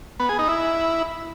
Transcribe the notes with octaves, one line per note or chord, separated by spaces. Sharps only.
B3
G#4
D#4
E4